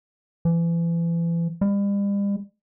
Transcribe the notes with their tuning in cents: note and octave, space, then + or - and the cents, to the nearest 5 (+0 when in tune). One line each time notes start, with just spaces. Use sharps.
E3 +35
G3 +40